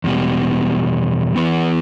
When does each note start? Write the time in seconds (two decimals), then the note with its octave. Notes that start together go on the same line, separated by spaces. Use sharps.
0.04 E2 B2 G3
1.36 E3 B3 E4 B4